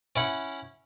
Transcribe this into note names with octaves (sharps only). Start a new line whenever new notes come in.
C#4 E4 F#5